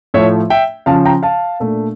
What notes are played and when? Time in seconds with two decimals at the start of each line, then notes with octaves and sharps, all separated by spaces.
0.14 A2 F3 A3 C#5 E5
0.50 E5 G5
0.86 C#3 F3 C#4 F5 A5
1.05 G5 A#5
1.23 F5 A5
1.60 A#2 A3 D4